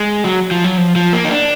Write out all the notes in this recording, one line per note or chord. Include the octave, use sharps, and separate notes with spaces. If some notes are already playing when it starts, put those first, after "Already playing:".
Already playing: G#3
F#3
F3
F#3
F3
F3
A#3
D#4
D4